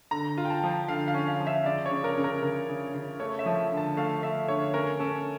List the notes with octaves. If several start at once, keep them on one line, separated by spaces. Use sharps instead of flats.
D3 A#5
F4
G5
A5
F3
D3 F5
F5
C#4
F5
F3
E5
C#3 D5
C#5
C#3
A#4
C#3
A#4
C#3 A#4
C#3
C#3
A3 C#5
E5
F3
D3
A5
A3 F5
A3 E5
D3 C#5
C#4 A#4
C#4 A4